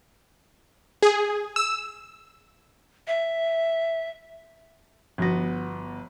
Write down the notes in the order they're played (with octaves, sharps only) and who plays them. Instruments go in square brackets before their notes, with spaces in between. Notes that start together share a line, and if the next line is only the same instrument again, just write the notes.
[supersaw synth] G#4
E6
[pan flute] E5
[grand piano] G1 B3 [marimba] F3 F#4 A#6